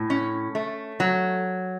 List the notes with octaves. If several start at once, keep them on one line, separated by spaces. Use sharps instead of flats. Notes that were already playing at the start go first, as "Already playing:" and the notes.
Already playing: A2
C#4
A3
F#3